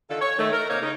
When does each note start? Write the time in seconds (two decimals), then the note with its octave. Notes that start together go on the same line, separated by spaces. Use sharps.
0.09 D3 D#3 F4 A4
0.21 C#5
0.38 D#3 A3
0.52 A#4
0.70 C3 A#3 D#4 A#4 C#5 F5
0.81 C#3 D#4